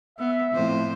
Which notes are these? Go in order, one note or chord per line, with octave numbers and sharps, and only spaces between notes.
B3 E5
F2 A2 C5